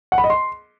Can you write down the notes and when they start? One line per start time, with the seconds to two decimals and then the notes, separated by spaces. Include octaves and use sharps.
0.12 F#5
0.18 B5
0.24 D#5
0.30 C6